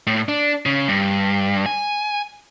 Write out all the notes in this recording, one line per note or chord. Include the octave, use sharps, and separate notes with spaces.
A2
D4
C#3
G2
G#5